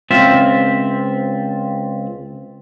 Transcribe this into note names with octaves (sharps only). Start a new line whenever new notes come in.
C#2 C4 F4 E5